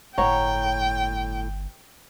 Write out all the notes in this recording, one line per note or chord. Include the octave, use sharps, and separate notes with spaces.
G1 A2 C#5 F#5 G5 A#5